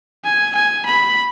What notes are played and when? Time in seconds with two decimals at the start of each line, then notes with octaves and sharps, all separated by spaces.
0.25 G#5
0.55 G#5
0.86 B5